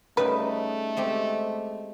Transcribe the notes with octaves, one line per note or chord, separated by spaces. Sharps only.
C#3 G3 A3 D#4 B4
G#3 C4 G4